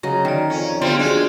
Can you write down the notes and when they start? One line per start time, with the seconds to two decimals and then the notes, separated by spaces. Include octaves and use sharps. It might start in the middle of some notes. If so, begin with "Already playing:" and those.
0.03 C#3 F#3 D#5 A#5
0.25 D#3 D5 A#5
0.50 F2 C#4
0.82 B1 D3 G3 C4 F4
0.99 A#1 G#3 F#4